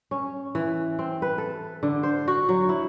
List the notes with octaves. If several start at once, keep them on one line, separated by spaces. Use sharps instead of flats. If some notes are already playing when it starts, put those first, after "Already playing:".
C#4
E3
C4
B4
A4
D3
C5
F#4
F#3
E4